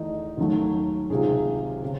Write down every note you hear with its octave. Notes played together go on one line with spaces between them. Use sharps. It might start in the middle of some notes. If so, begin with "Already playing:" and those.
Already playing: E2 D#3 A3 D#4
D#2 D#3 F#3 A3
C#2 C3 D#3 G#4
C#3